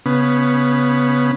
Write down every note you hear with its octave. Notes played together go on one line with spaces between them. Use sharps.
C#3 B3